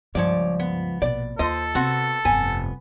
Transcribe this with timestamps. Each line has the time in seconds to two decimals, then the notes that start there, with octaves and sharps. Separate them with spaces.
0.15 C#2 G2 F3 C#5 D5
0.60 B3
1.02 A#1 B2 D5
1.39 D#2 F4 A4 C5 D#5
1.75 C3 B3 C4 F#4 F#5
2.25 F1 G2 B3 G#5